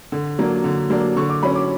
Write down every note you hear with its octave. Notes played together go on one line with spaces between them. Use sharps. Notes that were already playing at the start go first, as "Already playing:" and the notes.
D3
F#3 A#3 D4
D3
F#3 A#3 D4
D3 C#6
D6
F#3 C#4 B5
D6